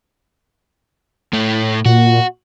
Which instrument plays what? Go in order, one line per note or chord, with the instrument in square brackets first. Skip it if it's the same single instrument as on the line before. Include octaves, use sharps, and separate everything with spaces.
[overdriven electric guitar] A2 A3
[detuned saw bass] A#2 [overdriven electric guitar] F#4